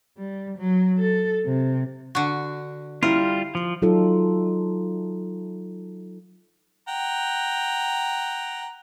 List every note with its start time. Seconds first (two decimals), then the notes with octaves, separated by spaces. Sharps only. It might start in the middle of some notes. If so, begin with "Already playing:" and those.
0.18 G3
0.58 F#3
0.98 A4
1.46 C3
2.15 D3 F#4
3.03 G3 E4 F4 A#4
3.55 F3
3.82 F#3 D#4 F4 A4
6.88 F#5 G5 A#5